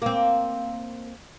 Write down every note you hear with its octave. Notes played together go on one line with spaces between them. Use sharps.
A#3 C4